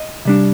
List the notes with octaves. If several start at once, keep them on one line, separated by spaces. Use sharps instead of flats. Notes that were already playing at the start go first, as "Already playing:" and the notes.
Already playing: D#5
C3 G3 D4